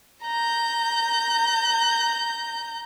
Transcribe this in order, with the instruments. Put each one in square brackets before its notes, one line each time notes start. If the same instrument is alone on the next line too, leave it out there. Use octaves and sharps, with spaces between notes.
[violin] A#5 G6